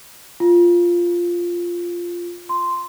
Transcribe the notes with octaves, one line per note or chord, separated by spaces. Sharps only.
F4
C6